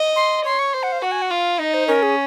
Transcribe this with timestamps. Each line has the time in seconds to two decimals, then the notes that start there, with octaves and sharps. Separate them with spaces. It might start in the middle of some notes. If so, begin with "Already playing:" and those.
Already playing: D#5
0.16 C6
0.45 C#5 C6
0.59 C#6
0.73 C5 C6
0.83 F#5
0.92 F5
1.02 F#4 F#5
1.12 G#5
1.22 F#5
1.31 F4 F5
1.59 D#4 D#5
1.74 C5
1.88 C#4 A#4
2.03 G#4